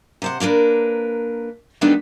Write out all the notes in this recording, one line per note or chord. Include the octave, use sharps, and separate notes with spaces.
C3 C5 F#5
A#3 D4 A#4 B4
D#3 G3 A3 B3 D4 D#4